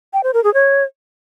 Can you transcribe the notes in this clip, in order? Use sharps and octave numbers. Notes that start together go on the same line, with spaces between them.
G5
C5
A#4
G#4
C#5